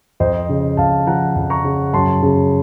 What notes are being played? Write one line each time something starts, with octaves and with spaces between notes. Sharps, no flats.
F2 C5 D#5
C#3
F2 F5 A5
F3 F#5 A#5
F2
A#5 C#6
C#3
F#2 A5 C6
C#3